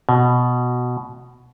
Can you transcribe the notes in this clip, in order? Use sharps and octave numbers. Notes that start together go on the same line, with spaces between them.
B2